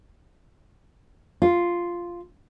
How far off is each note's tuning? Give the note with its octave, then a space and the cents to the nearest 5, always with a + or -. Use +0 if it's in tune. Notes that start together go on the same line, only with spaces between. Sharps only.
F4 -5